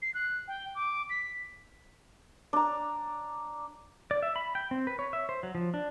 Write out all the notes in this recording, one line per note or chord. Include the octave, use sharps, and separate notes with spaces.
C7
F#6
G5
D6
B6
D4 A#5
D5
E5
B5
G5
C4
B4
C#5
E5
C5
F#3
F3
D4